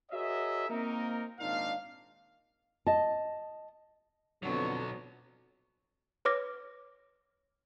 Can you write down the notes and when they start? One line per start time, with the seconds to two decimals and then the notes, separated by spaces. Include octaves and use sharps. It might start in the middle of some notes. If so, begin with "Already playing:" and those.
0.11 F#4 G#4 A#4 C#5 D#5 E5
0.69 A#3 C4 D#4 A#4
1.39 G#1 A#2 D4 D#4 F5
2.87 D#5 A5
4.43 F2 B2 D3 F#3 B3 C#5
6.25 B4 C#5 D6 F6 A#6